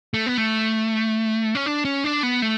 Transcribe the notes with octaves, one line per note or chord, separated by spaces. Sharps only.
A3
B3
A3
C#4
D4
C#4
D4
B3
A3